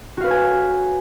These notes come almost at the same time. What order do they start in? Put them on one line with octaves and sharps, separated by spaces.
F#4 F5 B4 C#5 G#5